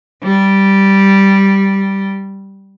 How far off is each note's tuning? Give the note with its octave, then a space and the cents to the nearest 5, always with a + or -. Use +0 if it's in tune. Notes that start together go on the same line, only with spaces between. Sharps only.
G3 -5